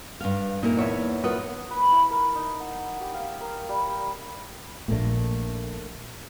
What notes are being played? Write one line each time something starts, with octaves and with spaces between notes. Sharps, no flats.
G2 F5
A#2 D#4 E4 A#4
E2 C#5 E5
F4 A#4 B4 F#5 D#6
B4
E4
A#4
D#4
F#5
G4
F5
A#4
G3
A#1 A#2 A3 A#3 D4